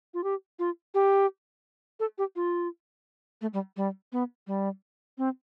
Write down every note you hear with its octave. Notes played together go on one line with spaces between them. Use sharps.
F4
G4
F4
G4
A4
G4
F4
A3
G3
G3
B3
G3
C4